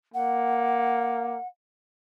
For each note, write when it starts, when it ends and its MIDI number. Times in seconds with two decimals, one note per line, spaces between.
0.14 1.38 58
0.14 1.47 78